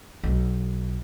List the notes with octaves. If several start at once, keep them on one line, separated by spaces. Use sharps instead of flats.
B1